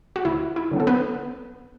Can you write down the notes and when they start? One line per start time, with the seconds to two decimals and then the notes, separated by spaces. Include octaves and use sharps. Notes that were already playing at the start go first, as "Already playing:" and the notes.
0.16 F#4
0.25 D2 E4
0.56 E4
0.71 D3 F#3 B3
0.80 A4
0.87 B3 B4